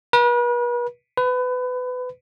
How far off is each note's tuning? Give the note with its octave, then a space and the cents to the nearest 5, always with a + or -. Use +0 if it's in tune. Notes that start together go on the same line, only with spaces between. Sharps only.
B4 -40
B4 +25